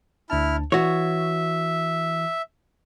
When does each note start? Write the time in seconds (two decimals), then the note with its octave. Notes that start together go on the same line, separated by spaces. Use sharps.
0.30 D2 D4 E4 A5 F6
0.72 E3 F#4 C#5 E5